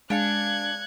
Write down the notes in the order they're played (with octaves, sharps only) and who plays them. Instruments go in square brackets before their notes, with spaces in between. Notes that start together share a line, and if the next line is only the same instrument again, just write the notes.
[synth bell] G#3 F5 C#7 [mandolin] D4 [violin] F#6 G#6